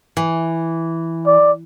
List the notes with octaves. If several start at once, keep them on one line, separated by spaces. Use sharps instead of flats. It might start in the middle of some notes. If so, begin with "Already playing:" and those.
E3
D5